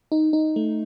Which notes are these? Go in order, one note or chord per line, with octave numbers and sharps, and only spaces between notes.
D#4
D#4
A3